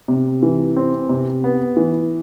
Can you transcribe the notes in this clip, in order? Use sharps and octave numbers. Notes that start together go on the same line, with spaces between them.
C3
E3
C4
C3
B3
E3